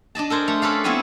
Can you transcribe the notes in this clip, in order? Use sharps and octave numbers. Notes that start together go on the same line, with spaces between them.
D4 D5 D#5 A5
A4 A#4 C5 G#5
A3
C#4 A4 B4 D5 F5
B3 C4 E4 C#5 G#5